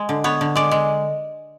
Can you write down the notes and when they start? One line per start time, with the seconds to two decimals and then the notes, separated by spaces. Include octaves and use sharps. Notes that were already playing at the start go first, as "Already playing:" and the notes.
Already playing: G#3
0.09 D3
0.24 B3 C#5
0.41 D3
0.56 G#3 D5
0.71 G#3